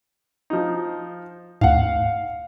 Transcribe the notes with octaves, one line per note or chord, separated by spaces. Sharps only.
F3 D#4
D2 G#2 F5 F#5